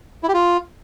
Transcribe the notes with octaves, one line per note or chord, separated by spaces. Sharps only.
E4
G4
F4